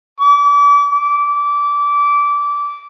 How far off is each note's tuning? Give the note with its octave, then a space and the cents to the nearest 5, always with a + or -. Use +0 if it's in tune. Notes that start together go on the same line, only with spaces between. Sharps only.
D6 -35
D6 -20